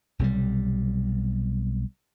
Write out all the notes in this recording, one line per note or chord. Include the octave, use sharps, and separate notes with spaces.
B1 C3 F#3 G3